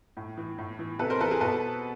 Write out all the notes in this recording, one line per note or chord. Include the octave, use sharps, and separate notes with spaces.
A2
E3
A2
E3
C3 A4 B4
A#4 C5
E3 A4 B4
G#4 A#4
B2 A4 B4